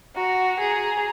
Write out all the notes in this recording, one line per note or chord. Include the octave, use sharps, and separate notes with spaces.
F#4 A#5
G#4